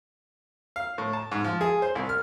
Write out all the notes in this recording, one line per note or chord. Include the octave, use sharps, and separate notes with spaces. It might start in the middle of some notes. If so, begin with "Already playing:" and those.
F5
A2
A5
G#2
F3
G#4
C5
C2
F6